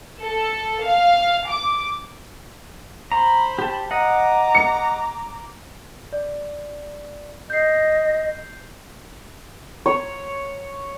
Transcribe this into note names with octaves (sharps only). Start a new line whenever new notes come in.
A4
F5
D6
C5 A#5 B5
G4 A5
D#5 F#5 A#5 D6
C#7
D5
D#5 G6 C7
C#5